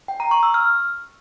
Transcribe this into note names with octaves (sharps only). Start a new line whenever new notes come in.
G5
A#5
C#6
E6
F6